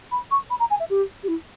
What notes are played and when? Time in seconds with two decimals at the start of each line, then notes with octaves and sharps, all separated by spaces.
0.11 B5
0.31 C#6
0.50 B5
0.59 A#5
0.70 G#5
0.79 E5
0.90 G4
1.23 G4
1.28 E4